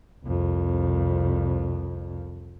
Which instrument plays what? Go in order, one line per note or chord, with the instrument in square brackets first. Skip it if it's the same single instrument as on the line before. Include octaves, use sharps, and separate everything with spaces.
[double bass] C2 F2